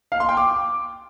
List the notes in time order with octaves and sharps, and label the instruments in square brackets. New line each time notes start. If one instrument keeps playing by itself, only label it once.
[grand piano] F5
C6
G5
D6